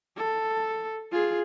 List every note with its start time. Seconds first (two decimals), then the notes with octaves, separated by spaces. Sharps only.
0.17 A4
1.12 F4 G#4